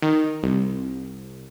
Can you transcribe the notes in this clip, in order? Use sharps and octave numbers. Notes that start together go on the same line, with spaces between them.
D#3
C2